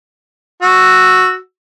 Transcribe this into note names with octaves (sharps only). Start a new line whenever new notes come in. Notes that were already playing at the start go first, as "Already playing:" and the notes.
F#4 E6